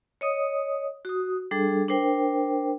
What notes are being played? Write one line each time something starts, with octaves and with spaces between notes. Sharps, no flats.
C#5 D#5 D#6
F#4 D#6
G3 D4 G#4 A4
D4 A#4 C5 G5